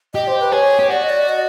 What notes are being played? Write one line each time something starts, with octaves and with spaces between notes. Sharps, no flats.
G4 D#5
C5
B4
G#4 C#5
G4
F#4 D5
D#5
D5
D#5